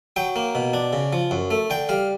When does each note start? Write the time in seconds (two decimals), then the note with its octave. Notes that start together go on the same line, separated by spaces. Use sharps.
0.16 F#3 G5
0.36 A#3
0.55 B2
0.74 D4
0.93 C#3
1.13 F3
1.31 F#2
1.51 A3
1.70 D3 G5
1.89 G3 F5